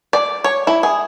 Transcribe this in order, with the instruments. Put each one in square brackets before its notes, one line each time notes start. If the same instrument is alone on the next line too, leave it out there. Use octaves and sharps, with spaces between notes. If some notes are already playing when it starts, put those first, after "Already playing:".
[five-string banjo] D5
C#5
E4
G#4